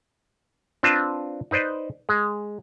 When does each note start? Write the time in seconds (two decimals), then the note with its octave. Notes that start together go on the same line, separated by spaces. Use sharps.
0.83 C4 D4 F4 B4 A5
1.51 D#4 B4 C5 D5 D#5
2.09 G#3